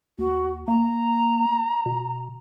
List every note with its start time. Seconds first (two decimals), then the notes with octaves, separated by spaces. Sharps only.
0.19 D#2 F#4
0.68 A#3 A#5
1.86 B2